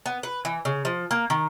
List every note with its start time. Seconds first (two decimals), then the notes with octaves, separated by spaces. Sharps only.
0.06 B3
0.23 B4
0.45 E3
0.65 C#3
0.85 F3
1.11 A#3
1.30 D#3